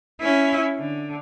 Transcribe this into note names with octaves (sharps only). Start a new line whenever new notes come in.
C#4 E4
D3